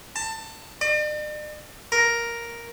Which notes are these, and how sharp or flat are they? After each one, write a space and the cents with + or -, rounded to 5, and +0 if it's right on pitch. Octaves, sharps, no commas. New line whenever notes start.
A5 +20
D5 +45
A#4 +5